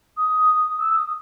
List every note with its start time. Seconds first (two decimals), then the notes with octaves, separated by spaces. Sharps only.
0.17 D#6
0.79 E6
0.95 D#6